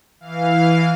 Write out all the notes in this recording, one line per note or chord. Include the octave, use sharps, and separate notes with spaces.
E3 F5